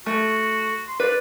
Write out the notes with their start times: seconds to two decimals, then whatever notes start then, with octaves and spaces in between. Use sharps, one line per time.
0.06 A3 F#4
0.88 C6
1.00 B4 D5